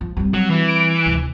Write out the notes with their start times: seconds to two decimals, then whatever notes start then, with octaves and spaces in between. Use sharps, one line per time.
0.01 F3
0.17 G3 C4
0.34 F#3
0.50 E3
0.67 D7
1.06 D2 C3